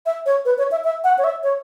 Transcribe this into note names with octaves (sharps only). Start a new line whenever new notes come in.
E5
C#5
B4
C#5
E5
E5
F#5
C#5
E5
C#5